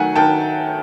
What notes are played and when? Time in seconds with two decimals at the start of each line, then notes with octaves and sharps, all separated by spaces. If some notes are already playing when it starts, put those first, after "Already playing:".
Already playing: D#3 F#3 A3 F#5 G#5
0.16 D#3 G5 A5